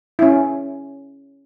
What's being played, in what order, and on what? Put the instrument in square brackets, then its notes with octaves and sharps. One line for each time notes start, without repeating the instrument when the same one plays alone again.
[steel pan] C#4 E4